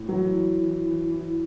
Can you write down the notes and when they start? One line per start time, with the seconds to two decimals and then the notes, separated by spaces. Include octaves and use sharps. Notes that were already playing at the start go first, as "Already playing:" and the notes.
Already playing: A2
0.09 E3 F#3
0.33 E3
0.60 E3
0.85 E3
1.10 E3